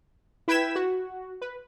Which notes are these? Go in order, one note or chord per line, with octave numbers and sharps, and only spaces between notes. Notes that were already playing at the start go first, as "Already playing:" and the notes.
E4 B4 G5 G#6 B6 E7
F#4
B4